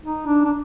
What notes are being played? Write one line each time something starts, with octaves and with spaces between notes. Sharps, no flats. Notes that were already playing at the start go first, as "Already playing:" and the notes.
D#4
D4
D4